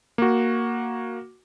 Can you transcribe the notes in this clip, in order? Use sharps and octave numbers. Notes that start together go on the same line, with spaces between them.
A#3 F#4